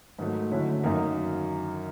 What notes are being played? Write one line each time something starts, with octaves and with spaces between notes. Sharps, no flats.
G#2 D#3 F#3 A3
D3 F#3 A3 C#4 E4
F#2 D#3 F#3 A#3 D#4